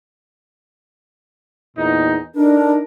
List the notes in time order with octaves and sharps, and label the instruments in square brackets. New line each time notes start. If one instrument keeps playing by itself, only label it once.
[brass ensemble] E2 A#2 D#4
[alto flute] D4 [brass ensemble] D#4 A4 A#4